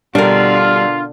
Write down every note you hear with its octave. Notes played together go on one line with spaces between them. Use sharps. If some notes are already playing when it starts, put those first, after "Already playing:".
B2 D3 G3 D4 F4 A#4